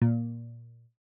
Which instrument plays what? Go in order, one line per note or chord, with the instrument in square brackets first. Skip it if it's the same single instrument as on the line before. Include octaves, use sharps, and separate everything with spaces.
[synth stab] A#2